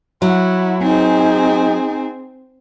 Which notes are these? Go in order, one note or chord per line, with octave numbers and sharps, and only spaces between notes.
F#3 E4 F#4
C4 D#4 G#4 G#5